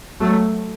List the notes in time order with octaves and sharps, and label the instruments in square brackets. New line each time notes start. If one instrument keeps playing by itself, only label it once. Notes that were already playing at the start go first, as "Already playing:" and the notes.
[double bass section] F#3 A3